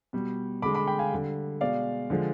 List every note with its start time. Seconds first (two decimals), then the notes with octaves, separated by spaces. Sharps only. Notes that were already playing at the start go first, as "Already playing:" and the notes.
0.13 B2 G3
0.62 D3 G#3 B5 D6
0.75 B5 D6
0.87 G5 B5
0.99 F5 G#5
1.12 D3 G3
1.61 B2 G#3 D5 F5
2.10 D3 F3 G#3